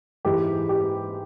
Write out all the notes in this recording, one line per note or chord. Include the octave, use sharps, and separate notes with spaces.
G#2 E3 G#3 G4
G4